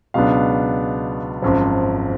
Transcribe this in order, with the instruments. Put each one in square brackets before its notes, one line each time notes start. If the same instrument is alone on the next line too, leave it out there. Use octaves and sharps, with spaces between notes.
[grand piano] C#2 B2 F#3 B3 D4 F5
G#1 F#2 F3